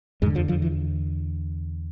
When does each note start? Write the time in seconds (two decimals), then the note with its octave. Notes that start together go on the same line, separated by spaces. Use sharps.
0.22 E2 G#2 G#3
0.26 D3
0.35 F2 F3
0.48 F2 F3
0.62 E3